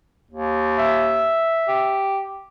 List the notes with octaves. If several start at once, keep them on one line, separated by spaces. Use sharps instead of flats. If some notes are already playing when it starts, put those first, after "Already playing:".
D#2
E5
G4